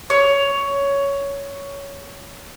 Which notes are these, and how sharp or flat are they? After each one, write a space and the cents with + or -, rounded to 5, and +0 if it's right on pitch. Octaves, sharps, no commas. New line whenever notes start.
C#5 +10